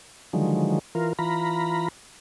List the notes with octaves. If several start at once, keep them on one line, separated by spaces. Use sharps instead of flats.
D3 D#3 F3 F#3 G#3
E3 F4 A#4
E3 F4 A#5 B5